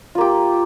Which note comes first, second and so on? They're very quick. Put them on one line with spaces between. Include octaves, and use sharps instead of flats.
F4 A#3 G4